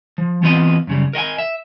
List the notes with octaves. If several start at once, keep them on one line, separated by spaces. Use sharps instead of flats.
F3
E3 B3 C4 F4 B4 D#5
F#2 C#3 G3
A#4 D#5 F#5 G#5
E5